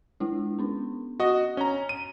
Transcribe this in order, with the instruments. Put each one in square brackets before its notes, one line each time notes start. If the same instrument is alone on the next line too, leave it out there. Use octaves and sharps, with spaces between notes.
[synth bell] G#3 D4 E4
B3 C#4 D4
[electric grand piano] F#4 D#5
[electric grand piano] C#4 A#5 [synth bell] G7
[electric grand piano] D#7